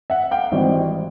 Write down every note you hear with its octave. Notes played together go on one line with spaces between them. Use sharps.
E5 F#5
F5 G5
G#1 G#2 E3 G3 C4